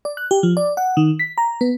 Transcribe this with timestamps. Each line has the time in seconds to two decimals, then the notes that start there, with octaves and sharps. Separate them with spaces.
0.05 D5
0.17 F#6
0.31 G4
0.43 F3
0.57 D5
0.77 F#5
0.97 D#3
1.19 B6
1.38 A#5
1.61 B3